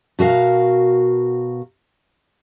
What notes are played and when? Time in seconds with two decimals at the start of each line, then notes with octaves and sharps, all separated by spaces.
0.19 B2 F#4 A#4 F5